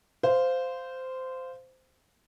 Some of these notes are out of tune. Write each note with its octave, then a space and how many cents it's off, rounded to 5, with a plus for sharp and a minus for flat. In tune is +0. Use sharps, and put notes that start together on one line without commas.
C5 -15 F5 +0